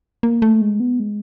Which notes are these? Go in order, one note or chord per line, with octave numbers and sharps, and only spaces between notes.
A#3
A3
G#3
B3
G#3